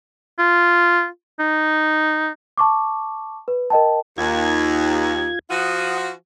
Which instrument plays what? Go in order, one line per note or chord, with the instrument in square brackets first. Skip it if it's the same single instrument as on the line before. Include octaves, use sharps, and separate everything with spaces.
[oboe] F4
D#4
[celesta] A5 C#6 D6
B4
A#4 D#5 G5 A5
[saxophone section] D#2 [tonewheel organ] F4 G#6
[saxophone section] F3 F4 F#4 [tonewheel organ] F#5 D#6